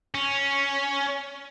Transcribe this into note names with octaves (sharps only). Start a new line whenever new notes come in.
C#4